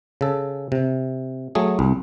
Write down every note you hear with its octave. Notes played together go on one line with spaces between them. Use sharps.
C#3 A4
C3
F#3 A3 G#4
C2